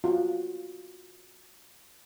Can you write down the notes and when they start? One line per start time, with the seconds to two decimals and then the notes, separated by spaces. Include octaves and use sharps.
0.04 F4 F#4